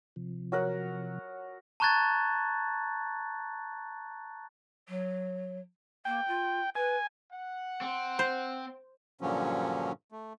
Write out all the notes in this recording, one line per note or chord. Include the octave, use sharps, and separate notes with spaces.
C3 F3
F#3 A#4 F#5
A5 A#5 C#6 F#6 G#6 A6
F#3
A#3 G5
F4
B4 G#5
F#5
C4
C5
G2 A#2 D3 F3 F#3 C#4
A3